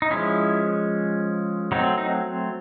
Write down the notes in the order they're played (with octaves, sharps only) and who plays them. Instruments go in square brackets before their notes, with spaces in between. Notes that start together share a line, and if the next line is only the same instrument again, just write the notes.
[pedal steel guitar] D#4
F3 G#3 C#4 E4
F#3 A3 C4 D#4
D#4